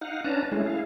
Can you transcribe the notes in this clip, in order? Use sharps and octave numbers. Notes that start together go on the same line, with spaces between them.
D#4 F5 F#5
C#4 D4 B4 A5 A#5
G#3 A3 C#4 E4 G#4
E4 G#4 F5